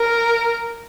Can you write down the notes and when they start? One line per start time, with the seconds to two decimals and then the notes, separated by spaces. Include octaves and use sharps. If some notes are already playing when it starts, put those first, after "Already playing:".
Already playing: A#4